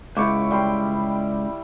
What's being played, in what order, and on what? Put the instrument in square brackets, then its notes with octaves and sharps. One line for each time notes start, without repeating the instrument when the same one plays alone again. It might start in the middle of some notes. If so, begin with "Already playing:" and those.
[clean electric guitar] C#2 [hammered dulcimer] E4 C#6 D6
[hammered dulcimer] G3 G5 C6